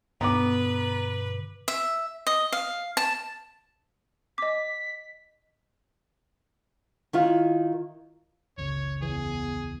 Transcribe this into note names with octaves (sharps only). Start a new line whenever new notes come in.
G2 B2 D3 B3 B4 A#5 D6
E5
D#5
F5
A5
D#5 D6 B6
D#3 E4 F4
F#1 C#2 C#3 C#5
E2 E3 G#4